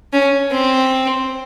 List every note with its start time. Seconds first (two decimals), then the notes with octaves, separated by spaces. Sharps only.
0.13 C#4
0.51 C4